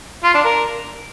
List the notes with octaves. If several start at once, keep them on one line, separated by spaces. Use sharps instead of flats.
F4
D4
A#4